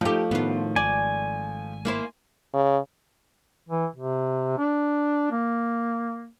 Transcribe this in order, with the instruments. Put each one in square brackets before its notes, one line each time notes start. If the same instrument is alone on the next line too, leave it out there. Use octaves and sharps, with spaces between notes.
[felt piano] F3 A3 [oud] D#4 G4
[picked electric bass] A2 D#3 [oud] B3 F4
[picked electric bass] G#1 [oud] D5 [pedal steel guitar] G#5
[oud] A#3 E4 C5
[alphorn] C#3
[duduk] E3
C3
D4
A#3